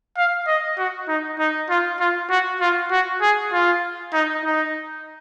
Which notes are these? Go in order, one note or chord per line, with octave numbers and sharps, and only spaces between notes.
F5
D#5
F#4
D#4
D#4
F4
F4
F#4
F4
F#4
G#4
F4
D#4
D#4